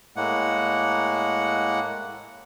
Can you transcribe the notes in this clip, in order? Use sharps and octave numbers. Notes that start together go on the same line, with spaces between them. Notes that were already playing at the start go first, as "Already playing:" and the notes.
A2 G#3 A#3 F#5